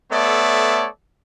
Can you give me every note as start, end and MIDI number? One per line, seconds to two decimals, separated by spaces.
0.12 0.87 57
0.12 0.87 59
0.12 0.87 69
0.12 0.87 73
0.12 0.87 74
0.12 0.87 76